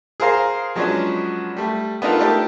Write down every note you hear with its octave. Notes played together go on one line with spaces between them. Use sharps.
G#4 A#4 C5 F5 A#5
F3 F#3 G#3 B3 C#4 D4
G3 A3
B3 D4 D#4 F4 A4 A#4
A3 D4 G4 A4 A#4